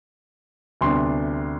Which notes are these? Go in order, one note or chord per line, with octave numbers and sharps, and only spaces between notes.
D2 C3 G3 B3 D4 C6